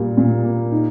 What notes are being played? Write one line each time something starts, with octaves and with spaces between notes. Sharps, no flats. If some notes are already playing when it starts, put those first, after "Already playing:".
Already playing: A#2 G3
A#2
A#3
D#4